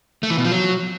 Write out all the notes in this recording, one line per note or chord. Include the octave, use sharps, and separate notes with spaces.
A3
E3
B2
F3
F#3